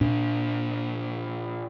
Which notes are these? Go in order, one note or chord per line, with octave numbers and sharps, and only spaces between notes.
A#2 D4